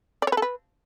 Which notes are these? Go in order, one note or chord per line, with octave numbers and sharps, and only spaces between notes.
D5
C#5
B4
A4
B4